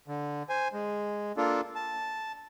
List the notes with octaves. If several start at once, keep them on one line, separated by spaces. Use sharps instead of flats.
D3
C5 G#5
G#3
A#3 D4 F4 A4
A5